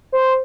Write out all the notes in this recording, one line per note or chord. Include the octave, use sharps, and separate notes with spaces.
C5